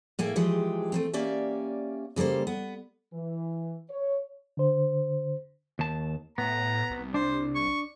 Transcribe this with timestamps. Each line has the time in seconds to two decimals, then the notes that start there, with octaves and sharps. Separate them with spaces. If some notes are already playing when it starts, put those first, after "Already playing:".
0.19 A2 A#3 E4 G#4
0.36 E3 F3 G#3 G4
0.92 A3 A#3 C4
1.13 A#3 C#4 G4 D5 E5
2.16 C#3 G3 A#3 A4 C5
2.47 B3
3.13 E3
3.89 C#5
4.57 D3 C5
5.79 D#2 A5
6.38 A2 B3 A#5
6.91 C2
7.14 D4 C5
7.55 C#6